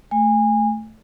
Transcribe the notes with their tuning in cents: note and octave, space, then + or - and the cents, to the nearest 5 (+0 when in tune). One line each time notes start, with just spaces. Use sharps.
A3 +0 G#5 -25